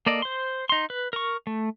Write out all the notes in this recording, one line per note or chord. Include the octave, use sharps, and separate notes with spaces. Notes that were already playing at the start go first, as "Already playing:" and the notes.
A#3 A4 D5 D#5
C5 C6
D#4 C6
B4
A#4 C#6
A3